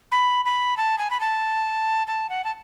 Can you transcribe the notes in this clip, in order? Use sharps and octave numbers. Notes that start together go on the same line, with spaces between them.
B5
B5
A5
G#5
B5
A5
A5
F#5
A5